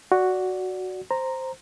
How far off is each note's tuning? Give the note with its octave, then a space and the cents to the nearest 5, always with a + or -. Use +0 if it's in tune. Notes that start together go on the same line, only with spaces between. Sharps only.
F#4 +0 D5 -10
C5 +0 A#5 -5